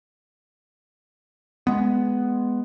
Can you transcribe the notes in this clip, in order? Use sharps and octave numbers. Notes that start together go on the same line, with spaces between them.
G#3 B3